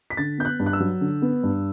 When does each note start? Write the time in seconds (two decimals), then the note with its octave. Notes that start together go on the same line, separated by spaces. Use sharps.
0.10 B6
0.17 D3 A6
0.38 B3 G6
0.45 F#6
0.60 G2
0.66 F#6
0.73 E6
0.80 F#3
1.01 D3
1.22 B3
1.43 G2